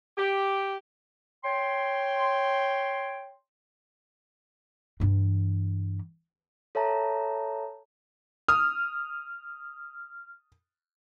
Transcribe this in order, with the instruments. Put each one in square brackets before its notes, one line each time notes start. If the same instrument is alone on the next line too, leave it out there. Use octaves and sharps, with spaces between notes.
[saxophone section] G4
[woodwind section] C#5 G5 C6
[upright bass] G2 E3
[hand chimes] A4 C#5 E5 A5 A#5
[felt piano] D#6 [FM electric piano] F6